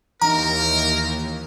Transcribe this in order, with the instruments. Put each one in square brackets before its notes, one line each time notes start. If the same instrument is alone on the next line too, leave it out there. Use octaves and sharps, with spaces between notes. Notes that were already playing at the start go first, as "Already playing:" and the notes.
[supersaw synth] D#2 [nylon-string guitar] E3 D#4 [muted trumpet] A#4 [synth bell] A#5